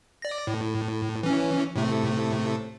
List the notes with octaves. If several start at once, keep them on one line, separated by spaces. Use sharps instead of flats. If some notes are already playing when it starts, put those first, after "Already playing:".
D5 A#6
A2
E3 C#4
A2 C3 A3